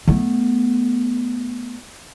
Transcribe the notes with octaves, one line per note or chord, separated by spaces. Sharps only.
A3 B3